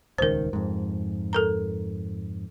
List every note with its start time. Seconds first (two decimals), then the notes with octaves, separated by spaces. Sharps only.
0.18 D#1 C#2 D#3 A#4 C5
0.53 F2 G#2
1.33 A4 A#4 A#5